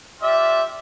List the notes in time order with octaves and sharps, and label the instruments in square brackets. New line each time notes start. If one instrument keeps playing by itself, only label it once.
[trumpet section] F4 G4 D5 E5